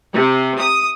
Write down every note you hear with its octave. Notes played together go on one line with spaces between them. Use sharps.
C3
D#6